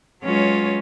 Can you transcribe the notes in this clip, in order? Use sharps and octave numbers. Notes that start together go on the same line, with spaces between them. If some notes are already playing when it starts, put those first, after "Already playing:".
F#3 G#3 C#4 F4 B4 C#5